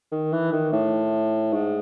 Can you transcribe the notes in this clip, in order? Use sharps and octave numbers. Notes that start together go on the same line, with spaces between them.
D#3
E3
D#3
A2
G#2